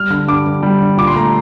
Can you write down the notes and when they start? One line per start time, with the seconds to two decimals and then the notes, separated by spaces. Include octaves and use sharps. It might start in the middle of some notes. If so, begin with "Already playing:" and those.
Already playing: G3 F6
0.10 D3 F6
0.28 G2 D6
0.46 G2
0.63 G3
0.80 D3
0.97 A#2 D6
1.07 C6
1.16 A3 A#5